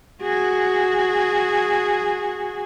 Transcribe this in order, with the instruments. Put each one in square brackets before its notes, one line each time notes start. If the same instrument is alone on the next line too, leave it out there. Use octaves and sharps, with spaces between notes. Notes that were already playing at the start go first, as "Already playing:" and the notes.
[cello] F#4 G#4